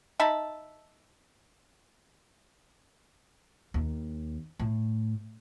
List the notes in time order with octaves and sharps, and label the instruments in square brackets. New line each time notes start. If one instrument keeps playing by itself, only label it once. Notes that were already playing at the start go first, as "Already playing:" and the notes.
[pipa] D#4 E5 A5 B5
[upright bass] D#2
A2